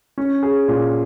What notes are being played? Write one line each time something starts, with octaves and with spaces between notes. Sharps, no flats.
C#4
G#4
A#2